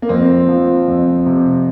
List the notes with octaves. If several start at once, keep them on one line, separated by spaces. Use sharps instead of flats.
A#3
F2 C4
F3
F2
C3